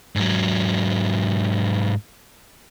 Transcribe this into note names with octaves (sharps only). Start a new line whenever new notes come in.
G#2 F#3